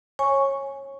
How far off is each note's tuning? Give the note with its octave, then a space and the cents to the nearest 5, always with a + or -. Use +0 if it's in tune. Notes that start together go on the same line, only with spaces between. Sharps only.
C#5 -20 G#5 +0 C#6 +0